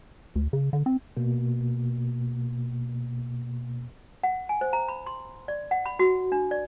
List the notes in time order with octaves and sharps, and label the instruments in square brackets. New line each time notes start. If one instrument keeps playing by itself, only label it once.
[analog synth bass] D2
C#3
D3
C4
[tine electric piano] B2 A#3
[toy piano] F#5
G#5
C5
A#5
B5
C6
D5
F#5
B5
F#4
D4
D5